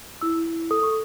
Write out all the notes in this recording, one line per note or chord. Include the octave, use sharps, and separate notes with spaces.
E4 E6
E4
A4 D#6
C#6